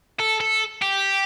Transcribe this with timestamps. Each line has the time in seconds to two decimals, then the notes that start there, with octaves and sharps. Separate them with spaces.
0.20 A4
0.40 A4
0.82 G4